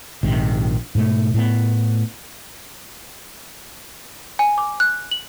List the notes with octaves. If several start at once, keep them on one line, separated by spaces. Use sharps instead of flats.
A#1 G#2 C3 D#3
G#2 B2 A3
A2 A3 B3
G#5
D6
F#6
F#7